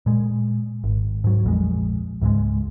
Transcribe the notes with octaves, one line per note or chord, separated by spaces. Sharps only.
A#2 G#3
G#1
G#2 F#3
A#1 F2 G#3
C#2 G#2 C#3 G#3